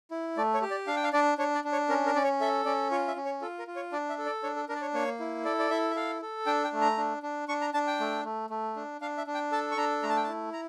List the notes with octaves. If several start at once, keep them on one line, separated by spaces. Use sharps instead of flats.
E4
A3 D5
C#5
G4
D5
D4 F5
G5
F5
D4 D5
D4 C#5
D5
D4
C#5
C#4 A#4
A#4
C#4 D5
C#5
A4 E5
C#4 D5
F4 C#5
E5
C#4
C#5
F4 A4
A#4
F4
C#5
D4 D5
E5
A4
D5
D4 C#5
A4
D4 A#4
D5
C#5
A#3 C#5
E4
A4 D5
D5
E4 E5
E5
A4 F5
A4
D4 G5
G5
A3
A#5
D4
D4
D4 C#6
A#5
D4 A5
G5
A3
A3
A3
D4
D4 F5
E5
D4
G5
A4 A5
C#6
D4 A#5
A3 A#5
A5
G5
A5
E4
A#5